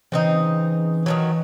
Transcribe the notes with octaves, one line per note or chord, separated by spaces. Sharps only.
C#3 E3 C4 D#4
D#3 F3 F#3